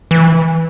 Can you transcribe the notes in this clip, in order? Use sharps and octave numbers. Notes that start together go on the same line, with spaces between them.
E3